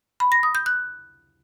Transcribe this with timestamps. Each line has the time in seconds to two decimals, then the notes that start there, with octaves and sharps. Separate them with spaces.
0.20 B5
0.32 A#6
0.43 D#6
0.55 G6
0.66 F#6